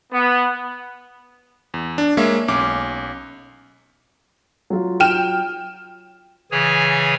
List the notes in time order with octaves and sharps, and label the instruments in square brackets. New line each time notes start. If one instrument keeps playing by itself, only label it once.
[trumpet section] B3
[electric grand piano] E2
D4
G#3 A#3 C#5 E5 F5
B1 C#4 D6
[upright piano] F#3 F4
[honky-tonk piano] G5 F6 E7
[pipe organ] C#3 E3 G#4 C#5 G#5